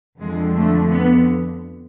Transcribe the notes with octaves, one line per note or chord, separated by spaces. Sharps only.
F2 D3 F3 G#3
A3
B3